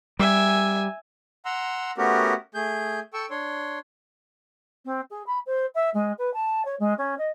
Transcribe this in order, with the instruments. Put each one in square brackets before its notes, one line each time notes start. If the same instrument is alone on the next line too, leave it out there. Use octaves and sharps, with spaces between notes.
[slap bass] G3 [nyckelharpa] E5 G#5
[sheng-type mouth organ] F#5 A#5 C6 E6
A3 B3 C#4 F#4 G4 A#4
A3 G#4 G6
A4 G5 C#6 E6
D4 C#5 C6
[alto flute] C4
G#4
B5
C5
E5
G#3
B4
A5
C#5
G#3
C#4
D#5